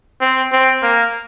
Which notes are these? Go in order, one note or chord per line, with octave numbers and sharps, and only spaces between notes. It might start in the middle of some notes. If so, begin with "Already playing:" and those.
C4
C4
A#3